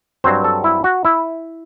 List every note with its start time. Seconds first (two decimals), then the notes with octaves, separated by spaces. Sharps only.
0.24 G2 F#3 C4 C5
0.44 A4
0.64 E4
0.84 F#4
1.05 E4